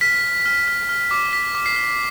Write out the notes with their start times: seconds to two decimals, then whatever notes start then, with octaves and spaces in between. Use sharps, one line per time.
0.01 F6 B6
0.24 F6
0.46 F6
0.68 F6
0.89 F6
1.11 D6
1.33 D6 B6
1.55 D6
1.66 C7
1.76 F6